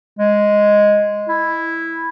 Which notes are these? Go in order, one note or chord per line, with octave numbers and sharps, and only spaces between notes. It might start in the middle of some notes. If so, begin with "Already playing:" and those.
G#3
E4